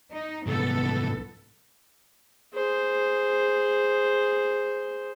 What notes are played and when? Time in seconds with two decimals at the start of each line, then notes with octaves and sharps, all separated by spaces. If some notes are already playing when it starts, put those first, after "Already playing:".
0.12 D#4
0.46 C2 G#2 B3 A4
2.54 G#4 C5